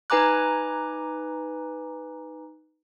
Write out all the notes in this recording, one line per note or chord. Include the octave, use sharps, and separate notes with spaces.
D#4 B4 G#5 A#5 D6 F#6